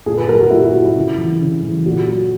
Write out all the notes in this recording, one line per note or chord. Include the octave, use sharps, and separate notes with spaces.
A#2 G#4
B4
F#3 A#4
F#4
A#2 E4
F#4
F#3
E4
C#3
E3
C#3
E3
A#2 F#4
F#3